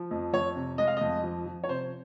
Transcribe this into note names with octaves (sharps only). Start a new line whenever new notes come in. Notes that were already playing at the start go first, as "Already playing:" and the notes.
Already playing: F3
F2
F2 C#5
C3
G#3 D#5
F5
F2 D#5
F3
F3
C#5
C3 C5